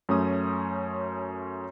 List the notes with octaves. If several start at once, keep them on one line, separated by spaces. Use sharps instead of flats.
F#2 A3 C#4 D#6